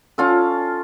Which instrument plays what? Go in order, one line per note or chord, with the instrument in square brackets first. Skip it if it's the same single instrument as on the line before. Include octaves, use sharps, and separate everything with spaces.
[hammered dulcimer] C#4 F4 A4